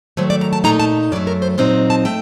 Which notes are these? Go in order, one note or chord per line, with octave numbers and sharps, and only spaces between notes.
D#3 F#3 A3 C5
D5
A#5
A5
A#2 A3 D#4 A#5
A5
F#2 F#3 A3 D5
A#4
C5
A#2 F#3 C4 D#4 C5
A5
A3 G5